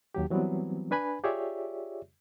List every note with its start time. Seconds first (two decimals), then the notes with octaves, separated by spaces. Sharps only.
0.15 D#2 F#3 G4
0.30 E3 F#3 G3 B3 C4
0.91 D4 B4 G#5 B5
1.24 F4 G4 G#4 C#5 D5 E5